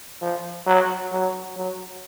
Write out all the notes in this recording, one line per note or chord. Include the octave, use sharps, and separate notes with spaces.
F3
F#3
F#3
F#3